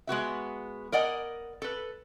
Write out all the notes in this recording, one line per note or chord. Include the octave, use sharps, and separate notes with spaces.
G#3 B3 F#4 E5
A#4 D5 D#5 F#5 G#5
A4 B4